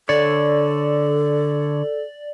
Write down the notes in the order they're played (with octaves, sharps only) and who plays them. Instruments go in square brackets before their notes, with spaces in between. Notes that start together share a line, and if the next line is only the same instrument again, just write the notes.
[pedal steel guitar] D3 C#5 [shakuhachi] A4 [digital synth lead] D5